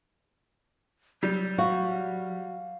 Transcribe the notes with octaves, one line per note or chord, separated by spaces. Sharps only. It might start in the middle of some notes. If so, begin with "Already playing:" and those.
F#3 G3
F#4 F5